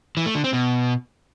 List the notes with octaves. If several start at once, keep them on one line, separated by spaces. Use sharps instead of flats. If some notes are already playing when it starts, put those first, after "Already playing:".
E3
A3
D3
C4
B2